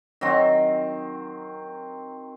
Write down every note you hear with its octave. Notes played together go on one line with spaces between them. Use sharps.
D#3 F#3 C4